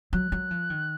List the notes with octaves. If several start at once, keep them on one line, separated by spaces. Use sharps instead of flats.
F#3 F#6
F#3
F3
D#3